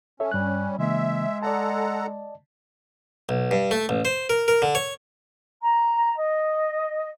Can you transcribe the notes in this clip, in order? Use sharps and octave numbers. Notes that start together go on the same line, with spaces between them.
C#4 A4 C#5 E5
G2 G3 F#6
C#3 E3 G#3 A#3 E5
A4 D5 D#5 F#5 A5 A#5
B1
G2
A3
A1
C5
A#4
A#4
D3
C#5
A#5
D#5